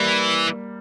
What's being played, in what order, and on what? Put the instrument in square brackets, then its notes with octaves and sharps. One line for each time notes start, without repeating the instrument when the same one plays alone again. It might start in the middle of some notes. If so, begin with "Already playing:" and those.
Already playing: [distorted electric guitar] E3 [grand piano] G3 A#3